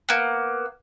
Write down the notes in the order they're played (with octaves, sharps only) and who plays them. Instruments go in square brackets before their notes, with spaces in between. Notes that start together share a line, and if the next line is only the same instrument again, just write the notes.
[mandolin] A#3 B3